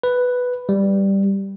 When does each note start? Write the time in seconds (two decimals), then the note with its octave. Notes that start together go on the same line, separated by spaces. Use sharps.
0.03 B4
0.69 G3